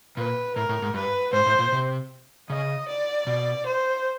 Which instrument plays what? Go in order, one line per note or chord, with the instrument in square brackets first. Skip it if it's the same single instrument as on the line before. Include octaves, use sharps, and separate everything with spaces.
[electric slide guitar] A#2 [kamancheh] B4
[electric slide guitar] A2 [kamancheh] A#4
[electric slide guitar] A2
G#2
[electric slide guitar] G2 [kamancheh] B4
[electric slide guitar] G#2 [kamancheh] C5
[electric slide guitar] A2
A#2
C3
[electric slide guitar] C#3 [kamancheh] D#5
[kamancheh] D5
[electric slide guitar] B2
[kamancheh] C5